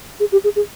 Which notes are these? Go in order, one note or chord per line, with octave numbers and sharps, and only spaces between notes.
G#4
G4
G#4
G#4